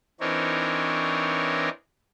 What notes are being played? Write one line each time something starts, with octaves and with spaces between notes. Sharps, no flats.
E3 C4 D4 D#4 A#4 C#5